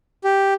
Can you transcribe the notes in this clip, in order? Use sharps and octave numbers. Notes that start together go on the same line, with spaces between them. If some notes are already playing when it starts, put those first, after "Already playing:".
G4